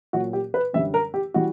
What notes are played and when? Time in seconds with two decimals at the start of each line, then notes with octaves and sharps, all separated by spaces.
0.13 A#2 F#3 F#4
0.33 G4
0.54 B4
0.73 F#2 D3 G3 E5
0.94 A#4
1.14 G4
1.34 E3 G3 F#4